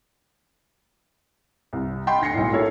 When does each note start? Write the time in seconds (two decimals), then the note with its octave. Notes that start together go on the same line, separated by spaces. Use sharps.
1.73 C2
2.07 D#5 F#5 G5 B5 C6
2.22 D2 A#6 C7 C#7
2.34 B1 A2
2.52 A#3 E4 A4 C#5